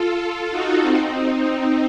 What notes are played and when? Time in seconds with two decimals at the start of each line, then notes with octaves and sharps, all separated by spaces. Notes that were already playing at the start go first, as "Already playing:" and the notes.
Already playing: F4 A4
0.51 D#4 F#4
0.81 C4 D#4